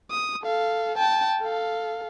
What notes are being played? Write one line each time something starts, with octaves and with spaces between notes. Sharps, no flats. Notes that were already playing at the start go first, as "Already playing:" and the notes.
D#6
A4 F5
G5 A5
A4 F5